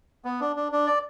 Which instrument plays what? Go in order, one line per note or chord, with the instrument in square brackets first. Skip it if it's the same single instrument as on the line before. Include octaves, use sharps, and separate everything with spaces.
[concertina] B3
D4
D4
D4
D5